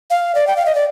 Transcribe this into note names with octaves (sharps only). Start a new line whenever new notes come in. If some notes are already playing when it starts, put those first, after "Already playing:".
F5
D5
G5
F5
D#5
D5